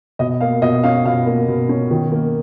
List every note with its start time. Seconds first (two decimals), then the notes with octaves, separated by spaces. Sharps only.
0.19 B2 D#5
0.40 A#3 F5
0.62 B2 D#5
0.83 C#4 F5
1.05 B2 F5
1.26 A#3
1.48 B2
1.69 C#4
1.91 D#3
2.12 A#3